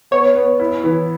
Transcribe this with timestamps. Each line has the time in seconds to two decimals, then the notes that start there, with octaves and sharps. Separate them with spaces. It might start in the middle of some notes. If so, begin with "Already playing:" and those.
0.11 B3 C#5
0.35 B3
0.60 E4
0.84 E3